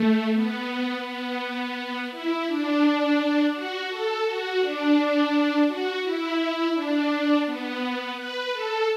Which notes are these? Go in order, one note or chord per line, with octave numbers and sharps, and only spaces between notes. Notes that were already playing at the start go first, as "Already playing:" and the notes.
Already playing: A3
B3
B3
E4
D4
F#4
A4
F#4
D4
F#4
E4
D4
B3
B4
A4